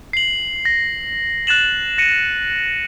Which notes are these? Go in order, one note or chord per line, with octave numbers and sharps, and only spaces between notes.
C7 F#7
A#6
F#6 A6 E7 F#7
A#6 C#7 D#7